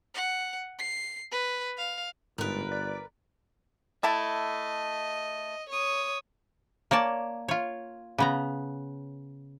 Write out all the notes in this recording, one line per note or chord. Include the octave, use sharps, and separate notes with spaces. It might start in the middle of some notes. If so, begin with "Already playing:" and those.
F#5
C7
B4
F5
G1 G#2 A#4 B4
D5
A3 E4 D#5 A5
C#5 D#6
A#3 C#5 D5 A5
F4 C#5
C#3 B3 A#5